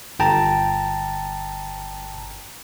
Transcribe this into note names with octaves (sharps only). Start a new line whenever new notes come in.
G1 G5 A5 A#5